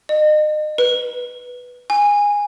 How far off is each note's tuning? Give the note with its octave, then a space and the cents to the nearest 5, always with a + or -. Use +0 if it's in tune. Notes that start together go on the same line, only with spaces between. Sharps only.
D#5 -35
B4 -5
G#5 -15